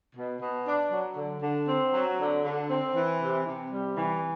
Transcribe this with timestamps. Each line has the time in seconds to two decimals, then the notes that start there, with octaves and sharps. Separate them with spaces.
0.16 B2
0.41 B2
0.66 D4
0.91 F#3
1.17 D3
1.42 D3
1.68 C4
1.93 F#3
2.19 D3
2.44 D3
2.70 C4
2.95 E3
3.21 C3
3.45 C3
3.71 G3
3.97 E3